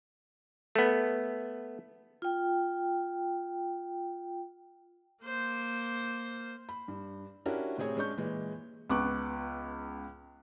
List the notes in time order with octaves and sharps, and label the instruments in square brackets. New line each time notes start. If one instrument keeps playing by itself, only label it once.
[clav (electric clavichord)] A3 B3
[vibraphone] F4 G5
[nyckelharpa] A#3 C5
[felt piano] B5
G2
C#4 D4 E4 F#4 G4 A#4
A2 C3 C4 G#4 C#5
G#3 C#4 D4 C#6 G6
A#2 E3 G#3
C#2 B3 C#6 D6 F#6